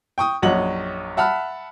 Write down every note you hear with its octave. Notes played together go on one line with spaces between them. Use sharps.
G5 C#6 D#6
A#1 F#2 C#5 D#5 F#5 F#7
E5 F#5 A5 B5 F6